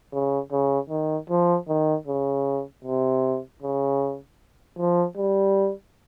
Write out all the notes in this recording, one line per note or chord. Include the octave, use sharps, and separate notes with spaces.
C#3
C#3
D#3
F3
D#3
C#3
C3
C#3
F3
G3